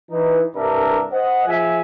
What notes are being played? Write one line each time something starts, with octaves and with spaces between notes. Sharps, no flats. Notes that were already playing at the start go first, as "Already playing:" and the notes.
E3 D#4
C2 G2 G3 D4 A#4 E5
C5 D#5 F#5
F3 G#4 E5 G#5